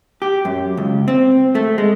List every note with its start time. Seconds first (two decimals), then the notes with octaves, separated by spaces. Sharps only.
0.22 G4
0.45 F#2
0.77 C#2
1.08 C4
1.55 A3
1.78 G#3